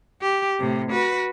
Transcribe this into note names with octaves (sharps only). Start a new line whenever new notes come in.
G4
A2 C3
F#4 B4